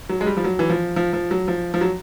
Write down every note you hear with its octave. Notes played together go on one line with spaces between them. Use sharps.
F#3
G#3
G3
F3
F#3
E3
F3
F3
F3
F#3
F3
F3
F#3